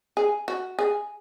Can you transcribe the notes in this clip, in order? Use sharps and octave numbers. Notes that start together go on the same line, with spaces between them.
G#4
F#4
G#4